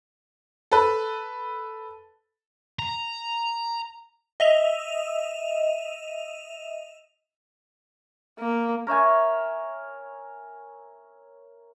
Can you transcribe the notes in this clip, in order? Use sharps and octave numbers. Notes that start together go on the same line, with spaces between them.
A4 B4
A#5
D#5 E5 F7
A#3
A#4 C#5 E5 G#5